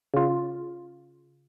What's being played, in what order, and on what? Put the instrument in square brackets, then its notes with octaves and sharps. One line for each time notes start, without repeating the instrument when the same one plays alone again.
[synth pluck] C#3 F4